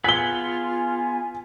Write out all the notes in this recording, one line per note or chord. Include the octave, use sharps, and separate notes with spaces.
B3 F4 G#4 F#5 G#5 B6 G7